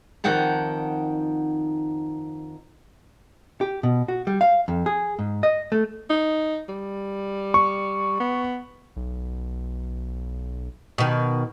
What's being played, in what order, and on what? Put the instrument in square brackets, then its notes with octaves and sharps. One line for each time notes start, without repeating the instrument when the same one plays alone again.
[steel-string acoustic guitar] F2 D#3 D#4 F#5 G5 A5
[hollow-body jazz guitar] G4
B2
F#4
G3
F5
F2
G#4
G#2
D#5
A3
[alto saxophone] D#4
G3
[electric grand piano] C#6
[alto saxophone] B3
[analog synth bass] B1
[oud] B2 D#3